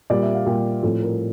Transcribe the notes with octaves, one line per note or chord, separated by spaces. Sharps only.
A#2 G3 D5
E5
F5
A#2 G3 G4
A2 F3 A4
A#4